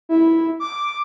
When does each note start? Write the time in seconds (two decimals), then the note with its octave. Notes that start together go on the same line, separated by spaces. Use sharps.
0.09 E4
0.60 D6